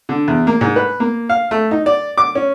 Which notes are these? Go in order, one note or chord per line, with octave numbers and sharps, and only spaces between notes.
D3
E2
A#3
G#2
B4
A#3
F5
A3
D#4
D5
D6
C#4